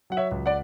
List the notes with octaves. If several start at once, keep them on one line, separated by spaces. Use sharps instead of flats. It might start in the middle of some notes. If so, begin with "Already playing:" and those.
F#3 F#5
C#5 E5
C#2
D5 F#5